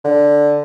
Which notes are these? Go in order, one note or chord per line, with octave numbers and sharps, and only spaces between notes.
D3